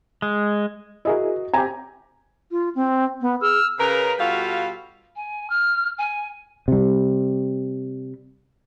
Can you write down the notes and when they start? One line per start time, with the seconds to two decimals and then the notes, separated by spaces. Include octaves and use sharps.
0.22 G#3
1.05 E4 F#4 G#4 A#4 D#5
1.54 C4 G4 G#5 A#5
2.51 F4
2.75 C4
3.21 B3
3.41 G#4 E6 F6
3.79 C#3 A#4 B4
4.19 B2 G3 F4 F#4 A4 F5
5.16 G#5
5.49 F6
5.98 G#5
6.68 C3 G3